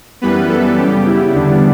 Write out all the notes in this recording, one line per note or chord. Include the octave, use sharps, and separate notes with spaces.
F#2 E3 G3 B3 B4
A4
C#3 G3 B3 G4
E4
E2 D3 G3 B3 D4